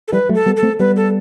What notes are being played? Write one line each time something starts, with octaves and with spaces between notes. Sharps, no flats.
A4
E3 G3 B4
F#3 A3
A4
G3 B3
A4
A3 C4
G3 B3 B4
A4